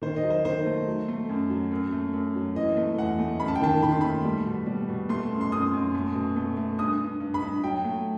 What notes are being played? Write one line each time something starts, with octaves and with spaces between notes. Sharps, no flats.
D#3 C5
D#5
F#3
C5
D#3 C5
A3
F#3
A3
F#2
F#3
F#2
A3
F#2
F#3
E3 D#5
A3
E2 F#5
A3
F#2 B5
A5
G5
D#3 A5
D#3 B5
C6
A3 B5
G3
B2
G3
B2
A3 C6
F#2
C6
F#2 D#6
F#2
A3
B2
A3
A3
G2 D#6
G2
G2
B5
G2
F#3 G5
A3